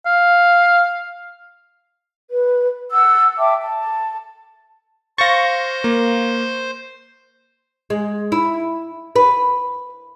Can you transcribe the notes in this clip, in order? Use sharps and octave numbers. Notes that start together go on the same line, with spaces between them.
F5
B4
F#5 E6
E5 G5 A5 D6
A5
C5 F5 C#6 A6 A#6
A#3
G#3
E4
B4